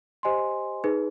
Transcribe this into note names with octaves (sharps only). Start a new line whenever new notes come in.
G4 C5 D#5 G#5 C6
D#4 G#4 B4